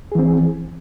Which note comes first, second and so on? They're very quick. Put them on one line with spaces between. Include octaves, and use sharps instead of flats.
G#4 E3 C4